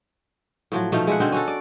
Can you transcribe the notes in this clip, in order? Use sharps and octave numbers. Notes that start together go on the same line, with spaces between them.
A2 F3 F#3
B2 F3 A3 D#4
G#3 E5 F#5
B2 D3 C4 D#4
C#4 F#4 A4
D5